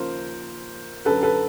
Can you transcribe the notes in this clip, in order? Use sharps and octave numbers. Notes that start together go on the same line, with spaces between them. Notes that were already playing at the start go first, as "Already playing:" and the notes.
Already playing: D#2 C#3 F3 A#4 C5
F#2 D3 F#3 A4 B4
A4 B4